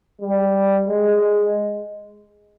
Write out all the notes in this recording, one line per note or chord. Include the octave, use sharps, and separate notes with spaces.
G3
G#3